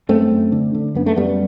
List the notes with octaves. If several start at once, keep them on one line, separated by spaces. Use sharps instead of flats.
F#2 A3 C4
F#2
D3
D3
F#2 B3
A3
F#2 G3 B3